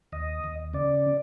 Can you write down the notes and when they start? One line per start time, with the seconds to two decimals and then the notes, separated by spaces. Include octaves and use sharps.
0.12 D#2 D#5
0.44 D#2
0.73 C#3 D5